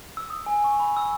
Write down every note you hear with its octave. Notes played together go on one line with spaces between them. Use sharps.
E6
D#6
G#5
C#6
B5
E6